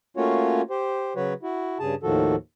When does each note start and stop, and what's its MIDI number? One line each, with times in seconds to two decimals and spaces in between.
0.17 0.62 57
0.17 0.62 58
0.17 0.62 61
0.17 0.62 65
0.17 0.62 66
0.17 0.62 73
0.70 1.13 67
0.70 1.13 72
1.16 1.33 49
1.16 1.33 54
1.16 1.33 66
1.16 1.33 71
1.16 1.33 73
1.43 1.78 64
1.43 1.78 66
1.80 1.95 43
1.80 1.95 49
1.80 1.95 68
1.80 1.95 81
2.03 2.35 39
2.03 2.35 45
2.03 2.35 51
2.03 2.35 53
2.03 2.35 66
2.03 2.35 69